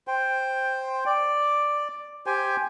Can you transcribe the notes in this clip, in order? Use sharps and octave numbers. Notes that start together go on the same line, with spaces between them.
C5 G5
D5
G4 C5 G5 G#5